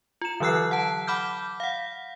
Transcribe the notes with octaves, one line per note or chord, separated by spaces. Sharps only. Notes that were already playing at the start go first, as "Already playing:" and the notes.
F4 E7
D3 E3 F#3 E6 F#6 C7
F#5 A5
F#5 B5 D6 F6 G6
F5 F#5